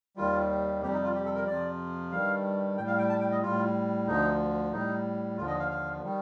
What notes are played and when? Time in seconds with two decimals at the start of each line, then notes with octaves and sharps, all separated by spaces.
0.17 D#2 D#3 G3 F4
0.82 F2 C3 G3 G4
0.92 D#4
1.03 F4
1.15 G4
1.25 A4
1.36 A#4
1.47 F2 C3 F3 D5
2.11 G2 D#3 G3 F5
2.77 A2 G3 G5
2.88 F5
2.98 G5
3.09 A5
3.20 G5
3.31 D#5
3.42 A2 G3 F4
4.07 D2 D3 F3 D#4
4.72 A2 G3 D#4
5.37 D#2 D3 F3 F4
5.48 D#5
5.60 F5
5.70 F5
6.03 D#3 G3